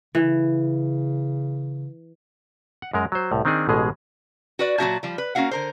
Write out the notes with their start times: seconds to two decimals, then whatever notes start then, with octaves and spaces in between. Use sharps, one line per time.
0.15 C#3 E3
2.82 F#5
2.93 F#2 G#3 A#4
3.12 F#3 C5
3.31 C2 A2
3.45 D#3 C4 D4 D#4 G#4
3.69 A1 B2 G#3 G#4
4.59 F#4 B4 D5
4.78 A#2 F#3 C4 F#4 E5 A5
5.03 F3 G3
5.18 B4
5.35 A#3 C#4 F#4 F5 F#5
5.51 D3 A#4 C5